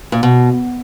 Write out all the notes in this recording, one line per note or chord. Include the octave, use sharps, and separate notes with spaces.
A#2
B2